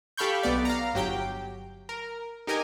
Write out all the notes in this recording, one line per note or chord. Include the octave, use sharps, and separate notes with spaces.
G4 A4 F5 B5 C#6 G6
B1 B3 D5
F5 A#5
G1 F#3 G4 G5
A#4
D#4 G4 A#4 D#5 G#5